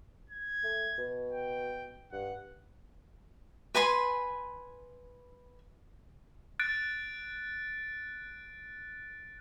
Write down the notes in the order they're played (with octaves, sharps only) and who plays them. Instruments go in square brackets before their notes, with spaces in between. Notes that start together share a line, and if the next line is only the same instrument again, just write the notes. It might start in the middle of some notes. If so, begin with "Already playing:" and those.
[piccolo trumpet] G#6
[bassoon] A3
B2
[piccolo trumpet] G5
[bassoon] G2 [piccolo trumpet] F#5
[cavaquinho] B4 G#5 B5 C6
[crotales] F#6 A6 D7